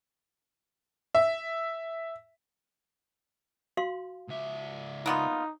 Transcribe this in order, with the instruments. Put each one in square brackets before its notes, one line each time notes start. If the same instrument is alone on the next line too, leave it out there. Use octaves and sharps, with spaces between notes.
[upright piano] E5
[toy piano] F#4 F5 C6
[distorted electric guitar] C#2 E5
[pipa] A#3 B3 F4 [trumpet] D#4